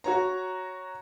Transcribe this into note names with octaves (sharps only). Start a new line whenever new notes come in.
F#4 C#5 A#5